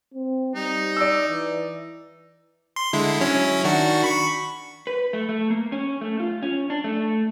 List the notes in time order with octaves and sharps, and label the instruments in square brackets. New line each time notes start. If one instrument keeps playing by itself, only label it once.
[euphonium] C4
[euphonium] G3 [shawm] D#4
[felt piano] D5 E6
[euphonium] E3
[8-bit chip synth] C6
D3 G#3 E4
F#3 C#4 E4
D#3 D4 F#4
B5 C#6
[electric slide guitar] B4
A3
A3
A#3
C#4
A3
F4
C#4
D4
A3